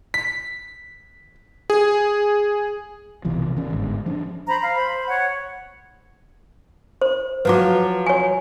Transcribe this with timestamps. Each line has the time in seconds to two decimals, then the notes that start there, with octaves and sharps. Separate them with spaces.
0.14 B6
1.70 G#4
3.25 B1 C3 E3 F3
3.57 D#3 C#4
3.70 G1 G#2
4.06 F3 C#4 D4
4.48 C5 A#5 B5
4.61 F5
4.76 C5 B5
5.07 C#5 F#5
7.02 C5
7.45 F3 F#3 F4 B4 D6
8.07 C#5 G#5